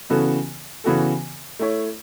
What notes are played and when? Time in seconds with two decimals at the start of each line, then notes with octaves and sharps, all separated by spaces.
0.10 C#3 E3 B3 F#4 A4
0.84 C#3 E3 B3 F#4 A4
1.59 A3 E4 C#5